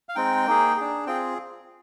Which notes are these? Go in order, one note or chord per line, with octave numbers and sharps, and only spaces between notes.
F5
G#3 C4 D#4 G5
A#3 D#4 G#4
D4 G#4
C4 F4 G#4 G5